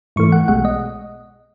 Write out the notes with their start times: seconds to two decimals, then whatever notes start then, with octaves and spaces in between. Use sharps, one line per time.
0.16 G#2 E3 A3 C#6
0.32 F#5
0.48 B1 B2 G#3 F#5
0.65 D#5